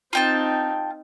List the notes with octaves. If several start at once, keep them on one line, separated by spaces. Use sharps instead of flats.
C4 D#4 F4 G5 A5